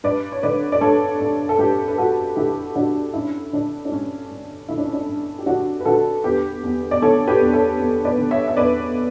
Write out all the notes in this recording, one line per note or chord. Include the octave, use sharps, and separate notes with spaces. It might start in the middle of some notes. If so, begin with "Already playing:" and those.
G2 B4 D5
C#5
D3 B4 D5
D5
G2 A4 C#5
G2
A4
G2 G4 B4
B4
G2 F#4 A4
D3 E4 G4
D3 D4 F#4
G2 C#4 E4
D3 D4
D4
G2 C#4
G2
D3 E4
D4
C#4
D4
G2
G4
D3 D4 F#4
B4
D3 F#4 A4
E2 G4 B4
E2
D5
D3 A4 C#5
G4 B4
E2
A4 C#5
E2
B4 D5
D3
C#5 E5
E5
E2 B4 D5